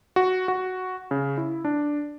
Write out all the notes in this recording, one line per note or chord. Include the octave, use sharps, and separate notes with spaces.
F#4
F#4
C#3
E4
D4